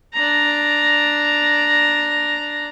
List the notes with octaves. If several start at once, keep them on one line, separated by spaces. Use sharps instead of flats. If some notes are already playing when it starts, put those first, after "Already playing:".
D4 A#5